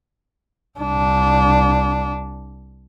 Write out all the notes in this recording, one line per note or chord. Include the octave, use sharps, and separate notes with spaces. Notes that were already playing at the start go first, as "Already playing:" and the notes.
C2 D4